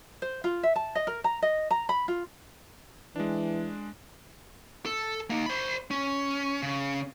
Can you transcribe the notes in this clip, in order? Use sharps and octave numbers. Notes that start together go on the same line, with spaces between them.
C5
F4
E5
A5
D#5
A#4
A#5
D#5
A#5
B5
F4
E3 G#3 D4
A4
A#3 D#4
C5 B5
C#4
C#3